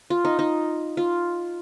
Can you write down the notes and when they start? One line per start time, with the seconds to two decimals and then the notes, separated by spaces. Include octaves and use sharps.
0.10 F4
0.25 D#4
0.39 D#4
0.97 F4